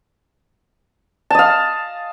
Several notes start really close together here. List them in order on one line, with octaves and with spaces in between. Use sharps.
A5 D#5 F5